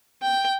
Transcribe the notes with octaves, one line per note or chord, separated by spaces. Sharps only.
G5